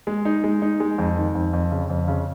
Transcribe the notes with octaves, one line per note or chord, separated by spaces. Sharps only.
G#3
D#4
G#3
D#4
G#3
F2
D#3
F2
F2
C#3
F2
C#3